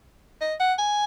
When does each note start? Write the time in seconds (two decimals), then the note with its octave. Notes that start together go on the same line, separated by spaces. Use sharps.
0.41 D#5
0.60 F#5
0.79 G#5